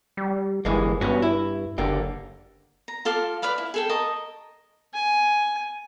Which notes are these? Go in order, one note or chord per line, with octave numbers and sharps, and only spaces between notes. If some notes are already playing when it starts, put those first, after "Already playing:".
G3
G1 E3 G#3 A#3
G2 B3 C#4 F#4
E4
F#1 D3 A#3 G4
A#5
F4 A4 F5 D6
B4 D5 F5 B5
E4
G#4 A4 G5
A#4 D#5 A5 C#6
G#5